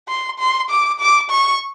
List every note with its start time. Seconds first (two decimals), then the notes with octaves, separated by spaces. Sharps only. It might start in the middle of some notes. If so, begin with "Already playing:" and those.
0.08 C6
0.39 C6
0.70 D6
1.00 D6
1.30 C#6